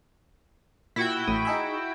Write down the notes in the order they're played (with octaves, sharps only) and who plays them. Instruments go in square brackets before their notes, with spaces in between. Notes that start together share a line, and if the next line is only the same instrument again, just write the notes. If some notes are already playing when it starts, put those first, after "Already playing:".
[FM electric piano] A#2 [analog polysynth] E4 F#4 G5
[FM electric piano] A1 A2 D#6
D#4 G#4 E5